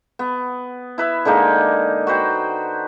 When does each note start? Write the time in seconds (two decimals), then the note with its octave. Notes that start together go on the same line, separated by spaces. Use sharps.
0.19 B3
0.98 E4 B4 E5
1.25 D3 G#3 A#3 D#4
2.07 F#4 B4 C5 G5